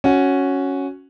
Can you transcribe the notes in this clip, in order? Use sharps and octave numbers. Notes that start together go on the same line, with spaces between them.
C#4 F#4